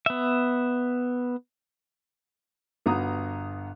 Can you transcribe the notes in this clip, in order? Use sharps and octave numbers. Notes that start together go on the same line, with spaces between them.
B3 E5
G1 B3 F#4 A#5 D#6